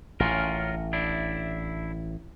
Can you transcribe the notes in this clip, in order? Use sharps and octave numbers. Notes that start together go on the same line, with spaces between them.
A1 C#4 F4 A#4
D4 E4